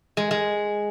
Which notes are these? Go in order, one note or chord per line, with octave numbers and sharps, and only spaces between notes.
G#3
G#3